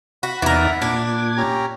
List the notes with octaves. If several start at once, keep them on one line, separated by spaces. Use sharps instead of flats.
F#4 F#5 B5
E2 E3 D#4 A#4 D5
A#2 D4 D6 G#6
C#4 G4 A#5